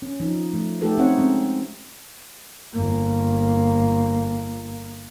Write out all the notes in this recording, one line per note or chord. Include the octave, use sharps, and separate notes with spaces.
C#4
F3 D#4
F3 A3
A3 D#4 F#4 G4 A4 B4
C4 C#4 D#4 C5 C#5 F#5
G#3 C4 C#4
G1 A#3